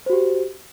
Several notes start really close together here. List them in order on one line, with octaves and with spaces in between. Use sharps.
C5 F#4 G4